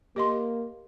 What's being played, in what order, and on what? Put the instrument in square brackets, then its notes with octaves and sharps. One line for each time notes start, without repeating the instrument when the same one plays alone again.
[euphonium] A#3 [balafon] G4 D#5 C6